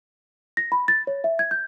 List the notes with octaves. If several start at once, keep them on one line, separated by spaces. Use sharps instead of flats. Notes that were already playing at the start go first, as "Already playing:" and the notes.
A#6
B5
A6
C#5
E5
G#6
G6